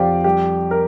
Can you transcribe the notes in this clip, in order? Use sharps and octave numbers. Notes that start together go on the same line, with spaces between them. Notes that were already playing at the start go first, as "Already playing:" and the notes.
Already playing: F2 F3 F4 G4 C5 D5
G3 G4
A#4